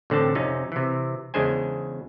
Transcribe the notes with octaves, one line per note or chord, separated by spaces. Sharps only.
A1 D3 C4 A5
F2 C3 C#4 D#4
C3 E3
E2 C#3 G#3 D4 C5 G#5